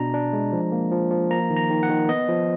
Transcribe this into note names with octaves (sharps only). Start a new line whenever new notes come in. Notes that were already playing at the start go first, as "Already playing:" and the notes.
Already playing: B2 D4 A#5
D4
G#3
F3
A#3
F3
F3
A#3 A#5
D#3
A#5
D#3
F#5
D#3
B3 D#5
F3